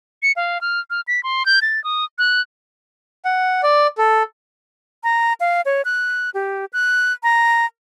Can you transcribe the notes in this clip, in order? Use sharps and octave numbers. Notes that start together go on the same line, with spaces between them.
C#7
F5
F6
F6
B6
C6
G6
A6
D#6
F#6
F#5
D5
A4
A#5
F5
C#5
F#6
G4
F#6
A#5